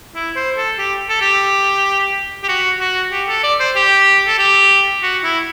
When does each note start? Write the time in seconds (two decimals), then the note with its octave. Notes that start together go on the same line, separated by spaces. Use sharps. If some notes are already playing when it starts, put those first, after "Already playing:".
0.15 E4
0.36 C5
0.57 A4
0.79 G4
1.09 A4
1.21 G4
2.44 G4
2.49 F#4
2.80 F#4
3.12 G4
3.28 A4
3.44 D5
3.60 C5
3.76 G4
4.28 A4
4.39 G4
5.03 F#4
5.24 E4